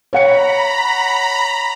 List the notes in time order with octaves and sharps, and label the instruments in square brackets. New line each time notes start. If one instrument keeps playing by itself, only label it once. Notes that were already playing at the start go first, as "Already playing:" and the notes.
[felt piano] C#5 F#5 C#7 [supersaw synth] A#5 B5